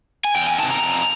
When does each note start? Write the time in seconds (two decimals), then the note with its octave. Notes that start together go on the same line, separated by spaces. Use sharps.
0.24 G#5
0.35 E2 G5
0.47 G#5
0.59 C3 D#3 A5
0.71 A#5
0.83 F2